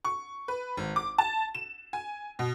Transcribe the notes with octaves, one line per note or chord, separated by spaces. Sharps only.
C#6
B4
G#1
D6
A5
E7
G#5
B2